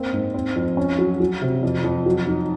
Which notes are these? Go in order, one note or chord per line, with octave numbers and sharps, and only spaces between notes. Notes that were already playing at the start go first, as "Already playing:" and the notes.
Already playing: A#3 C4
G#2
C4
F2
C#4
F#3
F#3
C3
F2
F2
F#3
D#4